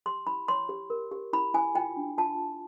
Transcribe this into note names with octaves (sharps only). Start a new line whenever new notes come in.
G4 C6
E4 B5
C#5 C6
G4
A#4
G4
E4 B5
E4 G#5
F4 G5
D4
F4 A5
F4